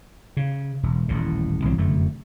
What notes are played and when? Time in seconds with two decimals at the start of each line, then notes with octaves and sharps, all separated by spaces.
0.37 C#3
0.83 E1
1.08 D#1 A1 A2
1.65 C2 E3 F#3 C4
1.78 F1 F#2 D3 A3